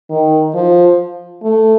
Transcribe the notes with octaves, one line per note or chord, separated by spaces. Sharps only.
D#3
F3
A3